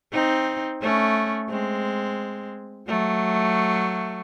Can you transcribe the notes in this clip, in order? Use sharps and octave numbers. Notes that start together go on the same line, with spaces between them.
C4 D#4
A3 C#4
G#3 C4
F#3 A3